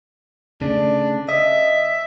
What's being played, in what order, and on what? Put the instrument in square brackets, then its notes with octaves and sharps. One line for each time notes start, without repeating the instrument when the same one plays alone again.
[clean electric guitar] C#3 A3 [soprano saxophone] D4
[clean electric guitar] D#5 [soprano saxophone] E5